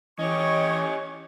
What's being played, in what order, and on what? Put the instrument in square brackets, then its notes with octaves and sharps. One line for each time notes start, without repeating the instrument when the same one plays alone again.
[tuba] E3 [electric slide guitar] C#4 G4 [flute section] C#5 C#6 [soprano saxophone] D#5